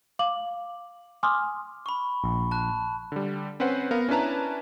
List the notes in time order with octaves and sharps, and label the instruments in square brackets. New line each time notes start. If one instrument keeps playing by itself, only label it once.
[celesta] F5 D6 F#7
G#5 C6 D6 D#6 F6
[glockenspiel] B5 C#6
[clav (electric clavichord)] A#1
[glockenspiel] A5 F#6
[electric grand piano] D3 G3
C4 C#4 B4 C5 F#5
B3 A#4 F5
C#4 D4 E4 B4 A5 A#5